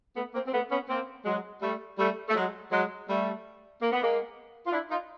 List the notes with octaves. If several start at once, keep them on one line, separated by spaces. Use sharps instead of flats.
A3 B3
A#3 C4
C4
A3 B3
B3 C#4
A#3 C4
F#3 G#3
G3 A3
G3 A3
A3
F#3 G#3
F#3 G#3
G3 A3
A#3
B3
G#3 A#3
F4
D4 E4
D#4 F4